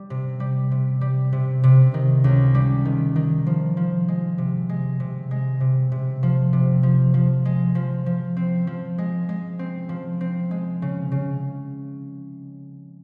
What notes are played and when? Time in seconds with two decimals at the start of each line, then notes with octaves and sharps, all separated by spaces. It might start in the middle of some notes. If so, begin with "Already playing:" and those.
Already playing: G3
0.10 C3
0.40 G3
0.71 C3
1.01 G3
1.33 C3
1.64 C3
1.94 D#3
2.24 C#2
2.55 G3
2.85 D#3
3.16 D#3
3.47 F3
3.77 F3
4.08 G#3
4.38 C3
4.69 G#3
5.00 C3
5.31 G#3
5.60 C3
5.92 C3
6.23 F3
6.53 C3
6.83 F3
7.14 F3
7.45 G#3
7.75 F3
8.06 F3
8.37 C4
8.67 F3
8.98 G#3
9.29 G#3
9.59 C4
9.89 F3
10.21 C4
10.51 G#3
10.82 C#3
11.12 C#3